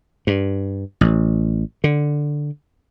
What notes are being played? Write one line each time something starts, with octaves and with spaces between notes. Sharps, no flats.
G2
A1
D3